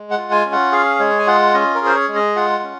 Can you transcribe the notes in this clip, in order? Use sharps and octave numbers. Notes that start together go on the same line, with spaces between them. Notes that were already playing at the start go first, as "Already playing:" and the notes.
Already playing: G#3
F#5
F4
G#5
C#4
F#5
G#4 F5
G#3 C#5
G#5
F4 F#5
C#4 D#5
A#4
G#4 C5
C#5
G#3
D#5
F4 F#5
C#4